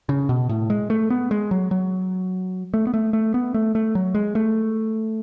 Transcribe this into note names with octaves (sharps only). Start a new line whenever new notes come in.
C#3
B2
A2
G#3
A3
B3
G#3
F#3
F#3
A3
B3
A3
A3
B3
A3
A3
F#3
G#3
A3